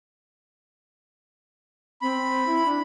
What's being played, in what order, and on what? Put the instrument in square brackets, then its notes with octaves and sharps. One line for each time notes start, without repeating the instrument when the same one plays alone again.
[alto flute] C4 [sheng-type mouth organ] B5
[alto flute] E4
D4